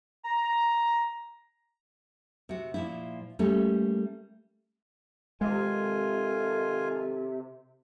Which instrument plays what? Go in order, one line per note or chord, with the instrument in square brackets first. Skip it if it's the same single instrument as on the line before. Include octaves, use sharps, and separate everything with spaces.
[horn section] A#5
[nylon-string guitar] C3 F#4
A#2 F3 E4
G3 A3 A#3 C#4 A4
[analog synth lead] C3 [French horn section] D#3 A4 [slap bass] G#3 [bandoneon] F4 G#5